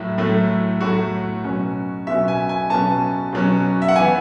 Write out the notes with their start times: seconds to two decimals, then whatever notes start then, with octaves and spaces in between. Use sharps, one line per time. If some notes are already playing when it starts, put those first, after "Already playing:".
Already playing: A2 F#3 A3 E4
0.18 A2 F#3 A3
0.80 A2 F#3 A3 F#4
1.44 B2 F#3 C#4
2.07 B2 F#3 C#4 E5
2.28 G#5
2.49 G#5
2.70 B2 F#3 C#4 A5
3.33 B2 F#3 C#4
3.82 E5
3.88 F#5
3.96 E3 B3 G#5